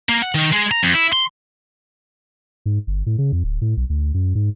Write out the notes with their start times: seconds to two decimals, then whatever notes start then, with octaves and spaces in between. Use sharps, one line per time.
0.09 A#3
0.22 F#5
0.35 D#3
0.52 G#3
0.71 A#5
0.83 F2
0.94 E4
1.13 C6
2.66 G#2
2.87 G1
3.06 A2
3.18 C#3
3.32 F2
3.44 D1
3.61 A2
3.77 B1
3.90 D2
4.14 F#2
4.35 G#2